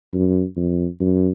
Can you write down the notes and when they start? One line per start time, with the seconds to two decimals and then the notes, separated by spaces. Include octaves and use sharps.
0.13 F#2
0.56 F2
1.00 F#2